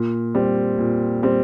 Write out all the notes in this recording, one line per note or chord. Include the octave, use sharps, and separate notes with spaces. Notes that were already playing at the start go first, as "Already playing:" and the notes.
Already playing: A#2
G3 C4
A#2
G3 C4